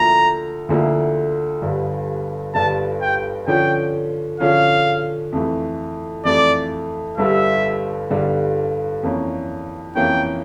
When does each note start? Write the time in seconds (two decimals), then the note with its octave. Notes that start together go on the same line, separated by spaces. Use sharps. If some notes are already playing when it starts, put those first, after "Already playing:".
Already playing: D2 D3 F3 A#3 E4 A#5
0.69 D2 D3 F3 A#3 E4
1.62 G1 G2 D3
2.54 G1 G2 D3 A5
3.01 G5
3.47 D3 F3 C#4 G5
4.40 D3 F3 C#4 F5
5.32 F2 E3 A3
6.25 F2 E3 A3 D5
7.18 G1 G2 D3 G3 E5
8.10 G1 G2 D3 G3
9.03 F2 E3 A#3 C#4
9.95 F2 E3 A#3 C#4 G5